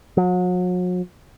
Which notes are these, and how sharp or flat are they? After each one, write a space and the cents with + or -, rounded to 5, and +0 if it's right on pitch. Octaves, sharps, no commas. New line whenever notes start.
F#3 -40